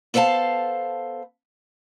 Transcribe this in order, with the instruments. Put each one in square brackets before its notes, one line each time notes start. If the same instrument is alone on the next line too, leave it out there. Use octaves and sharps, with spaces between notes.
[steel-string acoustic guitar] B3 A4 C5 F5 A5